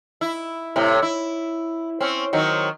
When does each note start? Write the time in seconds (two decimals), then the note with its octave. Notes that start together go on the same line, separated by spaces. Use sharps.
0.21 E4
0.76 A2 C3
1.02 E4
2.00 C4 C#4
2.33 D#3 F#3 C4